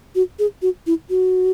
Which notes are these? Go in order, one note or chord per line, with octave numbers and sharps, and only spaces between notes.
F#4
G#4
F#4
E4
F#4